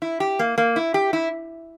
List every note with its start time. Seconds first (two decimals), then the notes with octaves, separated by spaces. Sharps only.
0.02 E4
0.20 G4
0.39 A#3
0.58 A#3
0.76 E4
0.94 G4
1.13 E4